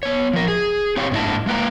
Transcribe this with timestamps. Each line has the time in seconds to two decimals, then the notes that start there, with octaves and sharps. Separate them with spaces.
0.03 B3 C#5
0.33 F3 A#4
0.48 G#4
0.97 C4 G4 C#5 F5 G5
1.11 G#2 A#3 D4 E4 D#5 A5
1.46 G#3 A#3 B4 G5 A#5